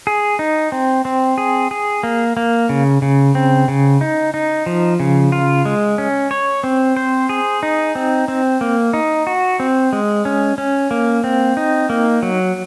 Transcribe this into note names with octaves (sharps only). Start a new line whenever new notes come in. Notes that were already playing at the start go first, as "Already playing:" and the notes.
G#4
D#4
C4
C4
G#4
G#4
A#3
A#3
C#3
C#3
C4
C#3
D#4
D#4
F3
C#3
F4
G#3
C#4
C#5
C4
C5
G#4
D#4
C4
C4
A#3
D#4
F#4
C4
G#3
C#4
C#4
A#3
C4
D#4
A#3
F#3